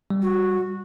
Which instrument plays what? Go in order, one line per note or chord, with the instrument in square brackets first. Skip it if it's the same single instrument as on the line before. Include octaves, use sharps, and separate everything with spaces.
[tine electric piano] G3
[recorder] F#4